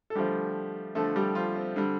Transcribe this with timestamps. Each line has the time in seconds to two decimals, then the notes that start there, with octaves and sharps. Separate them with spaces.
0.10 A4
0.15 D3 F3 G3 A3 G4
0.95 D3 F3 A3 A4
1.16 G3 G4
1.35 F3 F4
1.56 C4
1.76 D3 G3